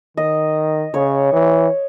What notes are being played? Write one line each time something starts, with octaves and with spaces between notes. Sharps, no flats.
D#3 D#5
C#3 C#5
E3